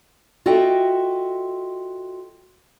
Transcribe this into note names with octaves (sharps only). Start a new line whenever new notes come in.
F4 F#4 A4 D#5 E5 G5